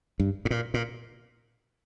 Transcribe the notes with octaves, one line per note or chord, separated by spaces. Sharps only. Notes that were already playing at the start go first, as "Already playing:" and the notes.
G2
G#2
A#2
A#2